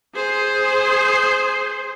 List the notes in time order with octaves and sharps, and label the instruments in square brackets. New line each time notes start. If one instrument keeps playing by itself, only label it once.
[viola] G#4 C5